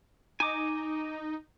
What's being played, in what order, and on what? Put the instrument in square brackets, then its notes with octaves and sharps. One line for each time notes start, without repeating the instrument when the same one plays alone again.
[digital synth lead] D#4 [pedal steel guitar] G#5 D6